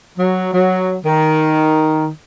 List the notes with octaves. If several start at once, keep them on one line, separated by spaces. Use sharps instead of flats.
F#3
F#3
D#3